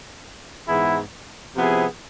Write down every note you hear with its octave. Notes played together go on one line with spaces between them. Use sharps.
G#2 E3 B3 E4 G#4
C3 F3 B3 E4 G#4